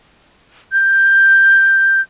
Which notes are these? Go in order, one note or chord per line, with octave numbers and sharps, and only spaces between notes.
G6